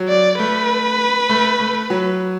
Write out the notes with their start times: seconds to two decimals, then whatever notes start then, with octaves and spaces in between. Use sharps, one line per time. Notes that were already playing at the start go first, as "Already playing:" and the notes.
Already playing: F#3
0.08 D5
0.39 A3 B4
1.29 A3
1.60 A3
1.90 F#3